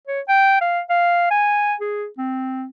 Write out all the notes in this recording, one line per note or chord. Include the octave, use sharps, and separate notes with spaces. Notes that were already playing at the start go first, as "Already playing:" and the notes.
C#5
G5
F5
F5
G#5
G#4
C4